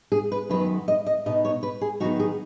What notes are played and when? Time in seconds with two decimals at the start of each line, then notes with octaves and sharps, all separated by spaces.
0.12 G#4
0.32 B4
0.49 F#2 D#3 F#3 B3 B4
0.88 D#5
1.06 D#5
1.26 B2 B3 D#4 D#5
1.45 C#5
1.63 B4
1.81 G#4
2.00 D#3 F#3 B3 D#4 F#4
2.20 G#4